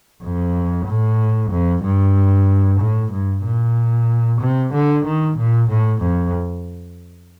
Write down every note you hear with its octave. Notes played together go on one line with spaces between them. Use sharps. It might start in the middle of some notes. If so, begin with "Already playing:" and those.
F2
A2
F2
G2
A2
G2
A#2
C3
D3
D#3
A#2
A2
F2